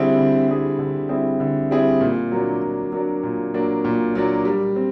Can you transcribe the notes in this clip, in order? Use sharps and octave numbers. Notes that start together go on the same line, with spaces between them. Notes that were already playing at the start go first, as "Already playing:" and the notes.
Already playing: D3 G3 C4 E4 G#4
D3
G3 C4 E4 G#4
D3
G3 C4 E4 G#4
D3
G3 C4 E4 G#4
A#2
F#3 A#3 D4
A#2
F#3 A#3 D4
A#2
F#3 A#3 D4
A#2
F#3 A#3 D4
G3
C4